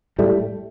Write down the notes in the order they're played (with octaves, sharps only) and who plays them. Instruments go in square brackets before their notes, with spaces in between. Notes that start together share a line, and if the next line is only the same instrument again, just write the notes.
[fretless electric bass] A2 G3 A3